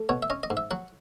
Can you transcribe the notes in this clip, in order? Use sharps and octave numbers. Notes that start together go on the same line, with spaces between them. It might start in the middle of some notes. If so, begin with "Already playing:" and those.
Already playing: A3
B2 C#5
E5
C#4 D#5
D#5
G#2
E5
F#3 F#5